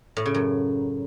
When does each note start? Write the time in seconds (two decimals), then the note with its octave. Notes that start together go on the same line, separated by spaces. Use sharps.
0.17 A2
0.26 C#3
0.34 F#2